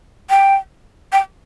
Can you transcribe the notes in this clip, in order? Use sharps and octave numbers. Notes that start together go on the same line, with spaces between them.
G5
G5